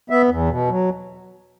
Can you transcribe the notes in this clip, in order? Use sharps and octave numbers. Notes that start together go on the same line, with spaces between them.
B3 E5
E2
B2
F#3